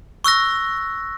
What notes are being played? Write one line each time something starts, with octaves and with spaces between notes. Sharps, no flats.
C#6 E6 F#6 A#6